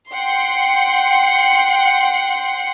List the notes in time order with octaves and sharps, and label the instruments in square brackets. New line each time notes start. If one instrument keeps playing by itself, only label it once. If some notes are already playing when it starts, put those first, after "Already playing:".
[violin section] F#5 G5 C6